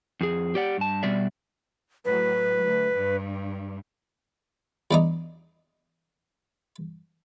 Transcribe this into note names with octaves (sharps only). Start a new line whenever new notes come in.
F2 G#4
G4 D5 F#5
G2 A5
B2 G3 D5 E5
A2 F#3 B4
D2
G2
E2 D4 D#4